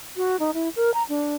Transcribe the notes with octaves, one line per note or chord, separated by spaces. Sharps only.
F#4
D#4
E4
A#4
A#5
D4